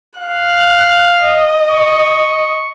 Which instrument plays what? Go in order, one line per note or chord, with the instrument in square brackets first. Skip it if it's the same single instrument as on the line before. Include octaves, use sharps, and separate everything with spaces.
[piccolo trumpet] F5 [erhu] F#6
[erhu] D#5
[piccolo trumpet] C#6